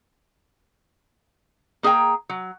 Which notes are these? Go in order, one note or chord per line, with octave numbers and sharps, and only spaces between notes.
A#3 G#4 D#5 G5 A#5
F#3